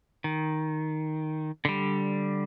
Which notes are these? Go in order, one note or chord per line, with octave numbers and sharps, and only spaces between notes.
D#3
D3 G3